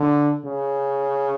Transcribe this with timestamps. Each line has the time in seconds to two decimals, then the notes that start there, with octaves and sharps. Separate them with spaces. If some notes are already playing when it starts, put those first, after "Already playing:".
Already playing: D3
0.45 C#3